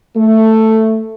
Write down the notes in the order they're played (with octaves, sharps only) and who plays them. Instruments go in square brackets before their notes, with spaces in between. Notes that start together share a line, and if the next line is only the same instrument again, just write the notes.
[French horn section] A3